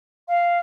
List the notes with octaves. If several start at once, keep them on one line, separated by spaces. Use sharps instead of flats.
F5